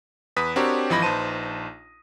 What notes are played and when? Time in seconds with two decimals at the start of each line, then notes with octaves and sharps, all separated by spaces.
0.36 E2 B4 D#6 B6
0.56 C4 D4 F#4 G4 A#4 C#5
0.90 G#1 E3 F3 D#5 B5 A#6
1.02 A#1 D#4 B4 C5 A5 D#7